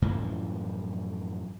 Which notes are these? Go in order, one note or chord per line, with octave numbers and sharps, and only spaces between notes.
F#2 A2 E3 F3